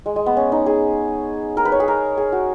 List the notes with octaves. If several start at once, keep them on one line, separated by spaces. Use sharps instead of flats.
G#3
G#3
B3
C#4
D#4
G#4
A#4
B4
C#5
G#4
A#4
G#4
F#4